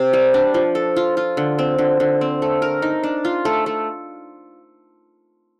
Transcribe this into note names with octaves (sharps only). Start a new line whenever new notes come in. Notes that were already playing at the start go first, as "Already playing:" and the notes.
Already playing: C3
G3
D4
F3
A4
F4
F4
D3
C4
D3
D3
C4
A3
A#4
D#4
D4
F4
A3
A3